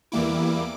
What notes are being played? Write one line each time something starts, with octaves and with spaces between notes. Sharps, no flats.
E2 E3 G3 A#3 E4 D6